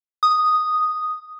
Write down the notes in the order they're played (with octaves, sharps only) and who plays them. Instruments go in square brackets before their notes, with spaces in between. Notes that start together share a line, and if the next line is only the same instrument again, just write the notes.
[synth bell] D#6